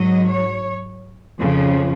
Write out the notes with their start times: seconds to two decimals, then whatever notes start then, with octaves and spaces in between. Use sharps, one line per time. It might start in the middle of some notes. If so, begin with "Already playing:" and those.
Already playing: G#2 F#3 D#5
0.28 C#5
1.39 F2 C#3 F3